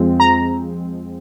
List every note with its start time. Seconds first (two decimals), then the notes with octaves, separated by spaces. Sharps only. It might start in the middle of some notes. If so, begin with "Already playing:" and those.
Already playing: F2 F3 G#3 C4
0.20 A#5